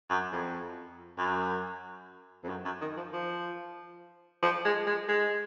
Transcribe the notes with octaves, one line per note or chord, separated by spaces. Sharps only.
F#2
F2
F#2
F2
F#2
F#2
D#3
F3
F3
F3
G#3
G#3
G#3